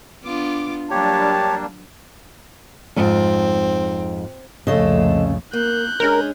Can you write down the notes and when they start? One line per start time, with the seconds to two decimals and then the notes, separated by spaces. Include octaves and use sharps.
0.24 B3 D4 F4 D6
0.91 F#3 G3 A#3 D4 G4 C#5 A5
2.96 F2 G#2 C4
4.67 C2 F2 A#2 C#3 A3 A4 D#5
5.53 A#3 A#4 F#6 G6
6.00 G#3 C#4 D4 G#4 A#4